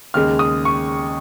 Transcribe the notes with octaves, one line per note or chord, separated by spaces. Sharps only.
D#2 C#3 G#3 F6
D#6
C#6